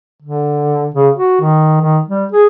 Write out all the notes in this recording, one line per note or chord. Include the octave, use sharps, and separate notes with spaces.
D3
C#3
F#4
D#3
D#3
G3
G#4